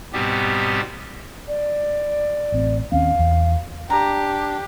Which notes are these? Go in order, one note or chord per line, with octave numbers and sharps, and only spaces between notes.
G#2 B2 G3 B3 C4 G4
D5
A1 C4
D#2 C4 C#4 F5
E2
D4 G4 A#5